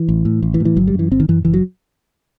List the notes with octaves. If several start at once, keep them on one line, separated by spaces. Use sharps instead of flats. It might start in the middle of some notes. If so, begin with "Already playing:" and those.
Already playing: E3
A1
A2
A1
E3
A2
E3
G1 F#3
G3
F#2 E3
G1 C4
D#3
F#2 E3
F#1 E3
F#3